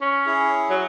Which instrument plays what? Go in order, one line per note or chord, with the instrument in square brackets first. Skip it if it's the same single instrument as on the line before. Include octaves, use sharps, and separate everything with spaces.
[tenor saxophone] C#4
[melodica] E4 G#4
[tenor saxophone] F#3